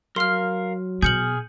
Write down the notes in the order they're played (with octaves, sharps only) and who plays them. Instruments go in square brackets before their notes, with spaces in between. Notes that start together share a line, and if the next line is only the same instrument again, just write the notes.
[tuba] F#3 [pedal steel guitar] A#4 F5 [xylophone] C6 F6
[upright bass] B2 [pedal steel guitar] G#4 F6 [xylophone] G6 C#7 F#7